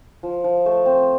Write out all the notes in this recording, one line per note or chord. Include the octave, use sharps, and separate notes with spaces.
F3
F3
A3
C4